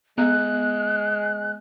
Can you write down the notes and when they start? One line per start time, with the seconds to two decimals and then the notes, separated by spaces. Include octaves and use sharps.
0.18 G#3 B3 F#6